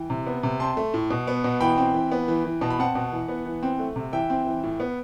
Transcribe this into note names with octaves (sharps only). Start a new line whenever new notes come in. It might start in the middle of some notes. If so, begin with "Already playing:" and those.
Already playing: E3 G5
C3
B3
C3
C4 A5 C6
A3
A2
B2
B3
B2
E3 G5 B5
C4
E3
B3
E3
E3
B2 A5
B5
C4 F#5 A5
B2
E3
B3
E3
C4
A3
C3
E3 E5 G5
C4
E3
A2
B3